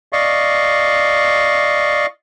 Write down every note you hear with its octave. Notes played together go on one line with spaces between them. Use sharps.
D5 D#5 F5 C#6